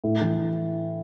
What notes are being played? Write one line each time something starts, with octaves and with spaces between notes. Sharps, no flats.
A2
E3